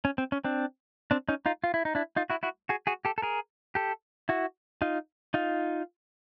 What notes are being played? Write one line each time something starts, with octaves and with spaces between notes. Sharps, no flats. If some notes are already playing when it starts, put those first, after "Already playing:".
C#4
C4
C#4
C4 D4
C4 D4
C#4 D#4
D#4 F4
F4
E4
D#4
D4 E4
D#4 F4
E4 F#4
E4 F#4
F#4 G#4
F#4 G#4
G4 A4
A4
G#4 A#4
G4 A4
E4 F#4
D#4 F4
D#4 F4